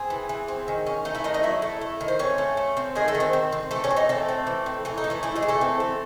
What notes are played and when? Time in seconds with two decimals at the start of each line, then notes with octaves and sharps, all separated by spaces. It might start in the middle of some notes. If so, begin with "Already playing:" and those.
Already playing: C4 G#4
0.10 E3
0.29 E3
0.48 C4
0.68 D#3
0.86 C#4
1.05 A3 D#4 D#5
1.15 E4 E5
1.24 D#3 D#4 D#5
1.34 D#4 D#5
1.43 F#3 E4 E5
1.62 A3
1.81 A3
2.01 D#3
2.08 C5
2.19 C4 C#4 C#5
2.38 A3
2.57 A3
2.77 C4
2.95 D#3 G#3 G#4
3.08 A3 A4
3.15 D#3
3.20 C4 C5
3.33 C4
3.52 C4
3.71 E3 A3 A4
3.84 C#4 C#5
3.91 C4
3.96 D#4 D#5
4.09 A3 C4 A4
4.29 C4
4.47 E3
4.66 C4
4.85 E3 C#4
4.98 D#4
5.04 A3
5.10 E3 E4
5.23 E3 A3 E4
5.36 G#3 G#4
5.43 E3
5.48 A3 A4
5.61 C4
5.80 A3